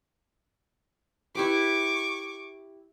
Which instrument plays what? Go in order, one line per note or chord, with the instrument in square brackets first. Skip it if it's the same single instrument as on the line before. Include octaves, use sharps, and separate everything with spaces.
[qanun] E4 G4 B4 [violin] C#6 D6